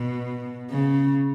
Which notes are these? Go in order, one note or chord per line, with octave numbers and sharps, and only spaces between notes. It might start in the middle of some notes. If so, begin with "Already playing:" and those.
Already playing: B2
C#3